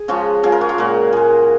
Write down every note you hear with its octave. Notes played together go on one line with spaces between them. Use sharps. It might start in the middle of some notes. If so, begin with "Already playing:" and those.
Already playing: G#4
C#3 F3 G#3 F#4
C#3 F3 G#3 G#4
A#4
F#4
F4
A#2 G#3 F#4
A#2 G#3 G#4